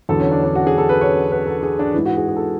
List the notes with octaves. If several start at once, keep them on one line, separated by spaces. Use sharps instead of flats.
E2 D3 F#3 A4
C#4
D4
D4
F#4
G#4
A4
B4
C#5
B4
A4
G#4
D4
G#2 E3 E4
F#4
G#4
G#4
A4